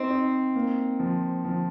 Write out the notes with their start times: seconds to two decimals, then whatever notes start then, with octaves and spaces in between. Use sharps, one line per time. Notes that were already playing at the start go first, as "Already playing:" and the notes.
Already playing: C4 D#4
0.11 D#4
0.55 A#3
1.00 F3
1.45 F3